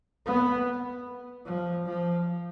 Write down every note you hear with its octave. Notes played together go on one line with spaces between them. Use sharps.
B3
F3
F3